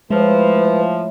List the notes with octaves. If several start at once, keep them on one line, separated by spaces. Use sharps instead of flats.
A2 F3 G#3 E4 B4